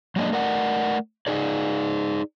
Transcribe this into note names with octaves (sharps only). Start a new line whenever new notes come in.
F#3 G#3 A#3 D4 D#5
A3 A#4 D5 F#5
D#4 G#4 D5